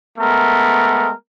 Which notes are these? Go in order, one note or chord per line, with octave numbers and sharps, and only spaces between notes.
G#3 A3 B3 A#4